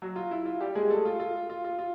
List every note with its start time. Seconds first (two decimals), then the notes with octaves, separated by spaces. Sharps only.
0.02 F#3 F#4
0.16 F4
0.31 E4
0.45 F4
0.60 G3 G4
0.75 G#3 G#4
0.90 A3 A4
1.05 F4
1.20 F4
1.49 F4
1.64 F4
1.79 F4